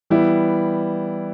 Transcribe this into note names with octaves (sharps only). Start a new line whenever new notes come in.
E3 G3 B3 E4